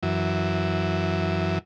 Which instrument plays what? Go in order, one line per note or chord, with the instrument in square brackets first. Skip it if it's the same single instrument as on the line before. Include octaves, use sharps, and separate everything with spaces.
[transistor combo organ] F#2 E3